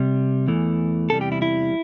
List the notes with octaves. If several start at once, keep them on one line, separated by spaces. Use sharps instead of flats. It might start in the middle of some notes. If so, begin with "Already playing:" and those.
Already playing: C3 G3
E2 E3 A3
E2 C3 E3 G3 A4
G4
E4
E4